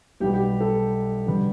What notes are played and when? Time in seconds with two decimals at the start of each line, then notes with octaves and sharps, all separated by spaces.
0.20 B1 B2 G3 B3 G4
0.34 G4
0.60 A4
1.26 D3 G3 B3